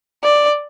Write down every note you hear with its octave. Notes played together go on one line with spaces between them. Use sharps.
D5